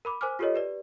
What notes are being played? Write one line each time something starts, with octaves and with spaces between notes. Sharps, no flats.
A#4 B5 D6
A#4 C5 G#5 D6 F6
F4 G4 A4 A#4 C#5 D#5
G4 B4 D5